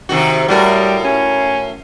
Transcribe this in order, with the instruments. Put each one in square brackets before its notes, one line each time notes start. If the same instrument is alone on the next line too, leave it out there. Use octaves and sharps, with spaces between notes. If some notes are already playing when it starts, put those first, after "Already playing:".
[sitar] C3 D#3 F#4
[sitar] A2 F#4 A#4 [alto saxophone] G3
[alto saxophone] C#4